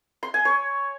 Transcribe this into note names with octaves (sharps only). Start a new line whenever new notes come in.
C6
G#5
C#5